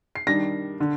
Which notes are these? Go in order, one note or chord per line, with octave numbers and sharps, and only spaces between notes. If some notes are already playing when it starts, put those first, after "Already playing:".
C7
D#3 G3 D4 A#6
D3